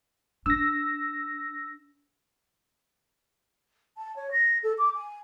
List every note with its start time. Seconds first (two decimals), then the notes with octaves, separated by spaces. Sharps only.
0.46 D4 E6 A#6
3.98 A5
4.16 C#5
4.32 A#6
4.63 A4
4.78 D6
4.95 G#5